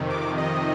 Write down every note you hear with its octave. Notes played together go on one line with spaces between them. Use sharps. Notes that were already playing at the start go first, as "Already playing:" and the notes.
Already playing: F2 C3 D#3
D6
D#5